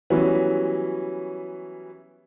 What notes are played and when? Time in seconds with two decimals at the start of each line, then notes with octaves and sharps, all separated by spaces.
0.10 E3 F#3 G3 B3 C#4